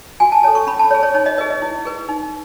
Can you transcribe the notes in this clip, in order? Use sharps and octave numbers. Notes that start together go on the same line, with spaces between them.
F#4 G#5
A5
A4 C#5 A5
C#6
C#4 B5
A5
C#5
G#4
C#5
D#4 C#5
D#5
G#4 B4 D#5
D#5
E4
G#4 B4
D#4